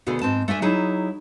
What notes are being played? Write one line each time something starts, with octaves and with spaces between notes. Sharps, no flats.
D2 B2 A3 G#4
G#2 C4 A5
A3 D4 E5 G#5
F#3 D#4 E4 G#4